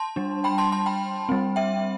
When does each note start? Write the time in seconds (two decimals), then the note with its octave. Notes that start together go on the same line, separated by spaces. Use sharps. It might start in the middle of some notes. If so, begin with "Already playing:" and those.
Already playing: A5 C6
0.16 G3 D4
0.44 G5 B5
0.58 A5 C6
0.72 A5 C6
0.86 G5 B5
1.29 G3 C4
1.56 E5 G5